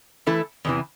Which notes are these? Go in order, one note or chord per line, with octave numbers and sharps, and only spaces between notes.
E3 A3 E4 A4
E2 C3 E3